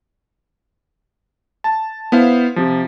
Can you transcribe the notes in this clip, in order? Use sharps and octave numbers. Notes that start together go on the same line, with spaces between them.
A5
B3 E4 C5 F5
C3 F3